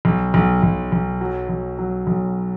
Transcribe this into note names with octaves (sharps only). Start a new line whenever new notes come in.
B1
B1
B1
B1
F#3
B1
F#3
B1